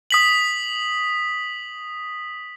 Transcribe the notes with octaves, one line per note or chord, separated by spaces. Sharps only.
D#6 B6 F#7